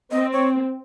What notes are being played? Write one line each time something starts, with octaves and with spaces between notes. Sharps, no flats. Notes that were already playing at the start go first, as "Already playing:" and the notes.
C4 D#5
C#5